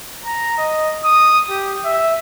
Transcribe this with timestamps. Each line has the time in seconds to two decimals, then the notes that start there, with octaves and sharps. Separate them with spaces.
0.25 A#5
0.58 D#5
1.04 D#6
1.49 G4
1.85 E5